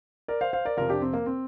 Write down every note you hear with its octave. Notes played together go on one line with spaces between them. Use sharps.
A#4 D5
C5 F5
C5 F5
A#4 D5
F2 C3 F3 F4 A#4
D4 G4
C4
A#3
C4